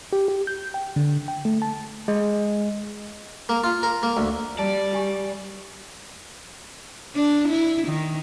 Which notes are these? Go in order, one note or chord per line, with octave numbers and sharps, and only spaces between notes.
G4
G4
G6
G5
D3
G5
A3
A5
G#3
A#3
F4
A#4
A#3
D2
G3 D5 A5
G4 G#5 C#6
D4
E4
D#3